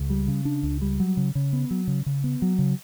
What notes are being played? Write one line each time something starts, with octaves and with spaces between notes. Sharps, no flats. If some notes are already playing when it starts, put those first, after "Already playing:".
Already playing: C#2
G3
C#3
D4
C#2
G3
F#3
C#3
C#3
B3
F#3
C#3
C#3
B3
F#3
C#3